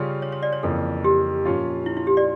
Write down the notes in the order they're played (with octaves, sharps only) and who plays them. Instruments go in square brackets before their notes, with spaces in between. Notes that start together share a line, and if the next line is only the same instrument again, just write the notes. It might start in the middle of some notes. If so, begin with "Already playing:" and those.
Already playing: [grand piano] C#3 G3 C#4 F4
[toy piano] C#5
C#5
D5
C#5
[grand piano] F2 C#3 E3 A#3 [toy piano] A4
[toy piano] G4
[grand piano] A#2 F3 C#4 F4
[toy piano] E4
E4
G4
D5